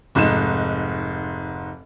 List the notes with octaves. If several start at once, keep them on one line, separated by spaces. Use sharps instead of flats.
F1 G#2 D#4 E7